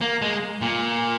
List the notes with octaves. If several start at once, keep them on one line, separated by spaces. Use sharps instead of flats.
A#3
G#3
A#2